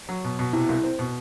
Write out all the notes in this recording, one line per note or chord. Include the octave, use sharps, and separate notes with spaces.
F#3
B2
B2
C3 E4
C2
C4
B2